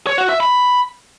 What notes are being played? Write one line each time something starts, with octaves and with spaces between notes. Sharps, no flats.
C#5
F#4
E5
B5